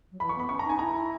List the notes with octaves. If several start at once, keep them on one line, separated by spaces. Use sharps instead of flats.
F#3
E3 B5
C#6
B3 B5
C#4 C#6
A#5
D#4 G#5
E4 A#5